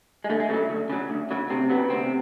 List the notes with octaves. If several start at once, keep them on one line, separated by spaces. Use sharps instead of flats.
G#3
D2 A3
G#3
C#3 F#3 A3
D2
C#3 F#3
D2
C#3 F#3
D2 C3 C4
B2 F#3 B3
C#3
D2 C3 C4